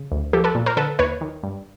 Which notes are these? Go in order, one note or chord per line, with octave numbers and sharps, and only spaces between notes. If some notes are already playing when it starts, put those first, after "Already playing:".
Already playing: C#3
D2
F3 G4 A4
A4 B4
A#2
A#4 C5
D3 A4 B4
D#2 B4 C#5
D#3
G2